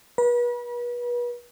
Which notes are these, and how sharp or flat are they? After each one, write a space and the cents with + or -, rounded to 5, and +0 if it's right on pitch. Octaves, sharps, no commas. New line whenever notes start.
B4 -35 B5 -45